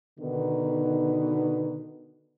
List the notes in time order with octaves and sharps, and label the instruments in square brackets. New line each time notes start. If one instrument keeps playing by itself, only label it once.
[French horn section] B2 D3 D#3 B3 D#4